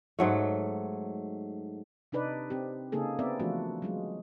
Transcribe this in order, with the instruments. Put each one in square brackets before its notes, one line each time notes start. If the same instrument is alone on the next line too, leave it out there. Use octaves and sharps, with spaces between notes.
[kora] G#2 F#3 A3
[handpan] C3 D4 D#4 B4 D5
C4 G4
C#3 A#3 D#4 G#4 A4
B3 C4 A#4 D5 E5
E3 F3 A3 D4 F4 F#4
F#3 G#3 F4